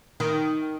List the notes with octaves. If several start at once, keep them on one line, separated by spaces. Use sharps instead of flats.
D#3